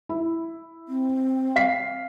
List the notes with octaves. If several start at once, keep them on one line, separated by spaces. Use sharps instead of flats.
E4
C4
F5 B6 C7